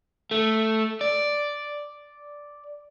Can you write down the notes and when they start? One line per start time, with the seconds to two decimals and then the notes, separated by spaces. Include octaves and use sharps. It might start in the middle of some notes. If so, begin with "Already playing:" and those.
0.31 A3
1.01 D5